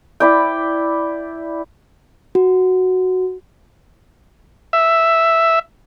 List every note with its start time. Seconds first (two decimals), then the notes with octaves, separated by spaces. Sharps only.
0.20 E4 D5 G5
2.35 F#4
4.73 E5